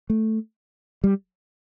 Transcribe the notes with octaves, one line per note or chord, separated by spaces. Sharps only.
A3
G3